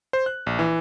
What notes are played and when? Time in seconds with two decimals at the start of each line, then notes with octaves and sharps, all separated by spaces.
0.13 C5
0.26 F#6
0.46 A#1
0.59 E3